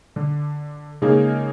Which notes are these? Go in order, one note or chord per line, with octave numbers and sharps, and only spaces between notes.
D3
C#3 G#3 A#3 D#4 G#4